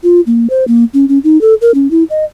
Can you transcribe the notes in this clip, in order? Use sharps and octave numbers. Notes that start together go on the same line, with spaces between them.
F4
A#3
C5
A#3
C#4
C#4
D#4
A4
A#4
C#4
E4
D#5